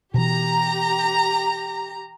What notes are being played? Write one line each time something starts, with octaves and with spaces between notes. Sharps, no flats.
B2 E3 G4 A#5